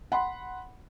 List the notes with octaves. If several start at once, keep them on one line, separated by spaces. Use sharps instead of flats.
F#5 B5 C6